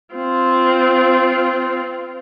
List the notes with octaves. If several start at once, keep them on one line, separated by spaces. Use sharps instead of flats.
C4 F4